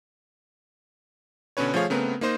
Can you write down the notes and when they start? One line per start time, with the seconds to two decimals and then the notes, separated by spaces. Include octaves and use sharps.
1.57 B2 D3 C#4 B4 C#5
1.74 F3 A3 G#4 C#5 F5
1.90 C#3 A3 B3 C4 A#4 B4
2.21 A#3 D#4 C5 D#5